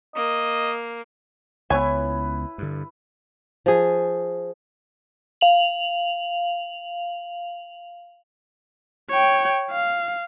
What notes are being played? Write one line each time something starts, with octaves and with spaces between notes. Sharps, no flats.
A#3 D#5
C#2 B3 E4 B4 C#5 G#5
G2 D3
F3 G#4
F5 F7 F#7
C#5 G5
F5